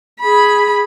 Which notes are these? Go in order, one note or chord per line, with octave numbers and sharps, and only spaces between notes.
G#4 B5